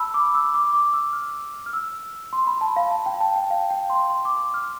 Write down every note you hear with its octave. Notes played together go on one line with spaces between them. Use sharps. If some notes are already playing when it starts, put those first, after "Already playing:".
Already playing: A5 B5 E6
D6
E6
D6
D6
E6
F6
F6
E6
C6
B5
A5
F5
A5
G5
A5
G5
F5
G5
C6
C6
D6
F6